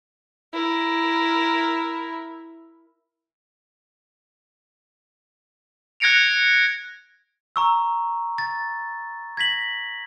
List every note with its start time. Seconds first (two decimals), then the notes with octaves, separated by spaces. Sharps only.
0.54 E4 A#4
6.00 F#6 G#6 A#6 C#7 D7 F7
7.56 A#5 C#6 E6
8.38 A6
9.37 G#6 A#6 B6 F#7